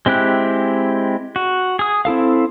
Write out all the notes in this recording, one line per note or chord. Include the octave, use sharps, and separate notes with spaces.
G#3 C4 E4 G4 F#6
F#4
G#4 D#6
C4 E4 A4 F5